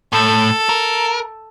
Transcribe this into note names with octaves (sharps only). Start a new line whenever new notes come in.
A2 A4
A#4